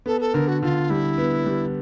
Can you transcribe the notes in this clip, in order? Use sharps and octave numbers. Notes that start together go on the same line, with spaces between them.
B3 A4
A4
D3 A#4
F#4
D3 F4
G3 E4
B3
G3